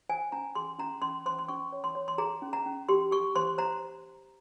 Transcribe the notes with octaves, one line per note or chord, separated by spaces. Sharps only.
C5 G#5
C#4 A#5
G#4 C6
C#4 A#5
C#4 C6
C5 C6
C6
C#4 C#6
C#5
C6
C#5
C6
G#4 A#5
C#4
A#5
C#4
G4 C6
G4 C#6
C5 C6
C5 A#5